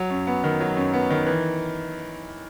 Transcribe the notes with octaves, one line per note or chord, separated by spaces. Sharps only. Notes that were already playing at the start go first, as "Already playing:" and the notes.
Already playing: F#3
F#2
B3
D#3
F#3
F#2
B3
D#3
E3